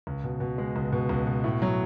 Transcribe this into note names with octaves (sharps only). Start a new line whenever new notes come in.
C#2
B2
B2
G#3
C#2
B2
C#2
B2
A2
F#3